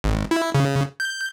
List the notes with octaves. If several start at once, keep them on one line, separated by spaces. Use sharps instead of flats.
G#1
E4
C#3
G6